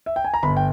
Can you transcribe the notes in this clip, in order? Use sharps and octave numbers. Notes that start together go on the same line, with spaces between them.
E5
G5
G#5
A#5
G1 B5
G5